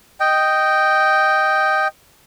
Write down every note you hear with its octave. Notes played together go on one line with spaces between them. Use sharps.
D#5 G5